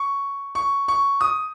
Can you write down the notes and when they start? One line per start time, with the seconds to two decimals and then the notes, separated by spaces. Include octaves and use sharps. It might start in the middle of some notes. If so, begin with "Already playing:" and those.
Already playing: C#6
0.55 C#6
0.88 C#6
1.21 D#6